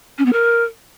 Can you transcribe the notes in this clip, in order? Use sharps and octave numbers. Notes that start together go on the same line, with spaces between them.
C#4
B3
A#4